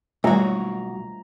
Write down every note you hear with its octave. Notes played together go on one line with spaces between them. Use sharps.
B1 G3 A3 F#4 C#5 A#5